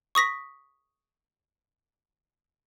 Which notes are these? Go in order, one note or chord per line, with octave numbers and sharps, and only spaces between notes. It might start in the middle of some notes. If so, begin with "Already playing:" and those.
C#6 D#6 A#6 B6